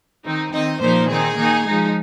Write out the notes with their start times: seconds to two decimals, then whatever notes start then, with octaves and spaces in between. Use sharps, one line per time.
0.25 D#3 C4 D#4
0.53 D#3 C4 D#4 D#5
0.81 A#2 F3 A#3 D#4 C5
1.09 D#3 C4 D#4 G#4
1.37 D#3 A#3 D#4
1.65 F3 G#3 D#4